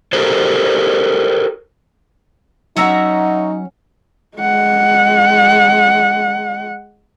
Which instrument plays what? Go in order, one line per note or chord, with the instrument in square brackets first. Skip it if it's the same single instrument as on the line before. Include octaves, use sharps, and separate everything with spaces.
[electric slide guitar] F#4 G4 A4 A#4 C5
[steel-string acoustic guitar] F#3 C#4 F#5 [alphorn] D#4 [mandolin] F#4 E5 A#5
[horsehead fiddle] G#3 F#5